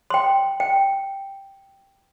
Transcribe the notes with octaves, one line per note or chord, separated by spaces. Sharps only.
G5 C6
G5